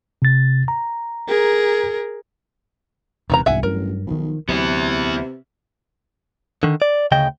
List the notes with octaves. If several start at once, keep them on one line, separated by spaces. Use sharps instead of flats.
C3 A6
A#5
G#4 A#4
E1 C3 D#3 E3 A#5
E1 C2 G#2 E5 F#5 G#5
A1 G2 F#3 A#4
B1 D#3 F3
D2 C3 F#3 B3 E4
D3 D#3
D5
D2 C#3 D#5 G5